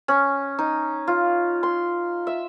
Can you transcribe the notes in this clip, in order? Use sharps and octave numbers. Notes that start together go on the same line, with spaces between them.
C#4
D#4
F4
C6
E5